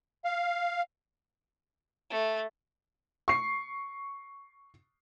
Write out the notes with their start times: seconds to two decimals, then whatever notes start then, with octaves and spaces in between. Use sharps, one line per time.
0.25 F5
2.10 A3
3.28 C#6 C7